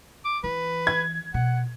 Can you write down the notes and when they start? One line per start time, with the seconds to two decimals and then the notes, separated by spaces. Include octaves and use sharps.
0.25 D6
0.43 E3 B4
0.87 G#6
1.34 B2 F#5